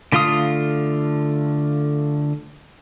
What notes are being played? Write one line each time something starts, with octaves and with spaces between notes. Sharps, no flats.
D3 A3 F4 F5 D#6